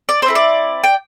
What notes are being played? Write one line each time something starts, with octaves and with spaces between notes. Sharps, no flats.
D5
C5
C4 E4 A4
D5
G5